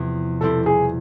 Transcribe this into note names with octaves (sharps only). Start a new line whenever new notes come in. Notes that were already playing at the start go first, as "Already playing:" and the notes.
Already playing: E2 C3 F3
B2 G3 C4 E4 G4 A4
G#4